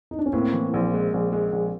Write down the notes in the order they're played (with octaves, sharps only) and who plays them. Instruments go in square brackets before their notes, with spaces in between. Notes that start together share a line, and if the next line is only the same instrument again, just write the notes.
[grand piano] D#4
D4
C#4
[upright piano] A2 [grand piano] A#3 C4
[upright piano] E3
A#1
G#3
A#1
G#3
A#1